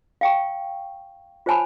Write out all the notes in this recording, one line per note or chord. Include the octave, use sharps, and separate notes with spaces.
F5 G5 C#6
F4 C5 C#5 G#5 A5 B5